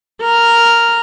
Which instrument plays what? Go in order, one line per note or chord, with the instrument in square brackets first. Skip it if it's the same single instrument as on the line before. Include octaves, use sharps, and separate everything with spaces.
[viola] A#4